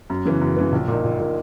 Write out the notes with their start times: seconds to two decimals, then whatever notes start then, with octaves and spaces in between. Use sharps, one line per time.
0.10 F#2
0.25 C#3 E3 B3
0.41 F#2
0.56 C#3 E3 B3
0.72 A#1
0.88 A#2 A#3 D#4
1.04 A#1
1.19 A#2 A#3 D#4